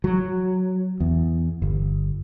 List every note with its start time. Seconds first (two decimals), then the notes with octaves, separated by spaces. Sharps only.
0.04 F#3
1.00 E2
1.62 G1